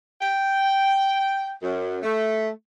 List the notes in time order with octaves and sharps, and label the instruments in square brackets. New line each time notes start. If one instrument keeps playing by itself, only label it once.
[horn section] G5
F#2
A3